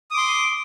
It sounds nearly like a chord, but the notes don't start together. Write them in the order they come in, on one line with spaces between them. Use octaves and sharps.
D#6 D6 C6